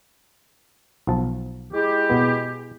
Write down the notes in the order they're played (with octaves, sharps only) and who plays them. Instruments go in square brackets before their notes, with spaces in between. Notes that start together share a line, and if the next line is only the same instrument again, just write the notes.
[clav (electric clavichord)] B1 F3 A5
[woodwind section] G#3 E4 G4
[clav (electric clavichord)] B2 B3